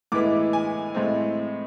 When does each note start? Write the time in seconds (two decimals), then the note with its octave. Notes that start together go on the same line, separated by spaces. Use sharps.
0.12 A2 E3 G#3 B3 E4 D6
0.53 G#5
0.94 A2 G#3 C4